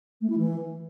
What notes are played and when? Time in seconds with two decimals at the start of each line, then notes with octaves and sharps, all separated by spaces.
0.21 A3
0.30 E4
0.38 E3